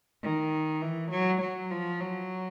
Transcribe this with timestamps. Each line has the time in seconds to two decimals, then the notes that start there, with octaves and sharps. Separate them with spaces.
0.23 D#3
0.82 E3
1.11 F#3
1.41 F#3
1.71 F3
2.00 F#3